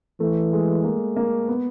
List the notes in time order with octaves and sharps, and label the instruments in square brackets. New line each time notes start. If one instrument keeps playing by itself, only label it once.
[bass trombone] E3 [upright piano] A3
[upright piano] G#3
A#3
A#3
B3